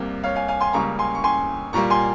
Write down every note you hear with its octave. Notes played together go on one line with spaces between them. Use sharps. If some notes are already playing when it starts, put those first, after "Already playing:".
Already playing: C2 C3 G3 A#3
C#5 F5
F5 G#5
F5 G#5
G#5 C6
C#2 C#3 G3 A#3 A#5 C#6
G#5 C6
C#6
G#5 C6
A#2 G3 A#3 A#5 C#6
G#5 C6